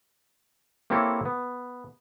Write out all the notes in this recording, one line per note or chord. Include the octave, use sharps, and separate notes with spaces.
A#3 C4 E4 G4 A4 C#5
B3